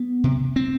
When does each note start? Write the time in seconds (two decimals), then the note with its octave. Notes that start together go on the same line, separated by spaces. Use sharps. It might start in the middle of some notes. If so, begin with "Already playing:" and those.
Already playing: B3
0.24 C3
0.56 C4